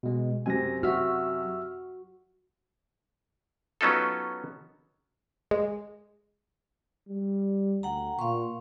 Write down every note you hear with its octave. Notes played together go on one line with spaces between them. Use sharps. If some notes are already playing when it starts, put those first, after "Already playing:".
B2 G#3
F#2 C3 C4 G#5 A#6
F#4 E5 E6 F6
F#3 B3 C#4 D#4 F4 A4
G#3
G3
D2 F#5 G5 A#5
A#2 F5 C6 C#6